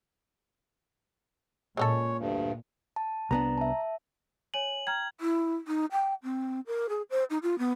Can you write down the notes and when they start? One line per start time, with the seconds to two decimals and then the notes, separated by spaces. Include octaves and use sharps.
1.77 A#2 G#3 C#4 A4 C#5
2.20 D2 G2
2.96 A5
3.31 C2 B3 D4 A#5
3.58 E5 A5
4.54 C#5 G#5 D#7 F#7
4.87 G5 A#5 F6 G#6
5.21 E4
5.68 D#4
5.92 G5
6.23 C4
6.67 A#4
6.89 G#4
7.10 C5
7.30 D#4
7.43 F4
7.59 B3